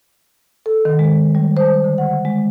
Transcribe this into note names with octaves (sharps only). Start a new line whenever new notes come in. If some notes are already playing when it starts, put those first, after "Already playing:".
A4
D#3
G#3
G3
C5
D3
F#5
G#3